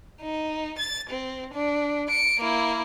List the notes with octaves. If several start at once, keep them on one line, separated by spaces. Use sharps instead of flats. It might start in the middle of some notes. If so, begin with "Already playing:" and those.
D#4
A6
C4
D4
C#7 D7
A#3 E4